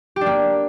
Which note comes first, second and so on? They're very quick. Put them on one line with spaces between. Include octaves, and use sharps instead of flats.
G4 D4 A#3